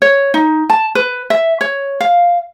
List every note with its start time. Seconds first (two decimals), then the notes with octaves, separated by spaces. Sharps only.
0.02 C#5
0.34 D#4
0.70 A5
0.95 B4
1.30 E5
1.61 C#5
2.00 F5